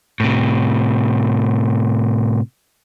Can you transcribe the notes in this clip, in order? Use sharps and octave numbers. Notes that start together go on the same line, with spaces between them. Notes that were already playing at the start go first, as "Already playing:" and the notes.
A2 C3